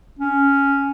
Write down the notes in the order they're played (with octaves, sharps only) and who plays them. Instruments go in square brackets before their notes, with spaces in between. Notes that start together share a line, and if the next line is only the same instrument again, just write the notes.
[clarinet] C#4